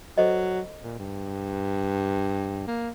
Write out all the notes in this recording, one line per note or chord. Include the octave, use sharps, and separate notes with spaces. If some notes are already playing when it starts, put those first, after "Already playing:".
F#3 A4 C5 D#5
A#2
G2
A#3